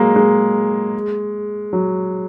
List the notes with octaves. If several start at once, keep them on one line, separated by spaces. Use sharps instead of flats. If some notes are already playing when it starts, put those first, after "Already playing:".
Already playing: F#3 G#3 A#3
G#3
F#3